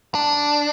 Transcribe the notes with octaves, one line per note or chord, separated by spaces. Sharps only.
D4